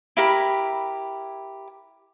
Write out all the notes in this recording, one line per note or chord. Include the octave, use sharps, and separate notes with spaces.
E4 G4 A#4 B5